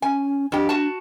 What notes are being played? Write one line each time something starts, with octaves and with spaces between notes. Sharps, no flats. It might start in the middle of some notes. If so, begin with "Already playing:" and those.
C#4 G#5
F2 D4 G4
F#4 A5